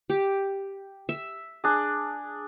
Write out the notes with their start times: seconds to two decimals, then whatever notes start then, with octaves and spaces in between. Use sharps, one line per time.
0.10 G4
1.09 E5
1.64 D4 G#4